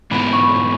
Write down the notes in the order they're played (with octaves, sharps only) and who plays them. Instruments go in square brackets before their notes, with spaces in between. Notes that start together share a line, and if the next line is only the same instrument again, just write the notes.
[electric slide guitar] G#2 E3 B3 [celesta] B5
[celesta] C#6
B5